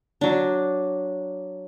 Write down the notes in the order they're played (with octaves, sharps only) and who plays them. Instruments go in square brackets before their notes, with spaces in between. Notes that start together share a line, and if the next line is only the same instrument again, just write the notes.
[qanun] F#3 D4